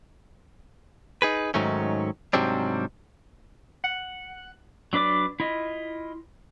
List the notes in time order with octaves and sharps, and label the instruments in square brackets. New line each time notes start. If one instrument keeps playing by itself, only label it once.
[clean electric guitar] D#4 G#4 B4
G#2 D#3 F#3 A3 C#4
G#2 C3 F#3 G3 C4 D4
[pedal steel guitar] F#5
F#3 D4 B4 D5 D6
E4 F4 D#5